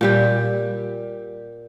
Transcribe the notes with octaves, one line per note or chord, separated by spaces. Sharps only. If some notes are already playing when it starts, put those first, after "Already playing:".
A#2 G3 G4